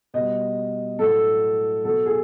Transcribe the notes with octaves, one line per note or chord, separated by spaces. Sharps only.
B2 G3 D#5
A2 F#3 A4
B2 F#3 A4
G#4